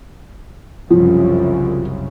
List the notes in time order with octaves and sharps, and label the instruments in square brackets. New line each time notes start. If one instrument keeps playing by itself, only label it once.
[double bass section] C2 F#2 C#3 [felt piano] F3